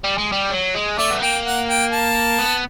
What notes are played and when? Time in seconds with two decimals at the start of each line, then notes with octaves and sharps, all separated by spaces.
0.04 G3
0.18 G#3
0.32 G3
0.50 F#3
0.74 G#3
0.98 A3 D5
1.10 B3
1.21 A#3 G5
1.45 F#5
1.69 G5
1.91 A5
2.39 B3